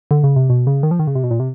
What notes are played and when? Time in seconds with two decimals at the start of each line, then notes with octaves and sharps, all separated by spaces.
0.11 D3
0.24 C#3
0.36 C3
0.50 B2
0.67 C#3
0.83 D#3
0.91 F3
0.99 D#3
1.07 C#3
1.15 C3
1.24 B2
1.31 A#2
1.40 C3